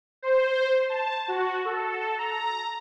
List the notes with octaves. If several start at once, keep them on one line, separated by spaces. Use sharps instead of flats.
C5
A5
F#4
A4
A#5